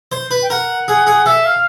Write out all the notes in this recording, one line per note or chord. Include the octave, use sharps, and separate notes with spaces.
C5
B4
G5
A#4 F#5
G#4
G#4
A4 E5
F5